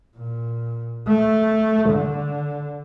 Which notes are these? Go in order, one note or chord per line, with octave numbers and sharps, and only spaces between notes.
A#2
A3
D3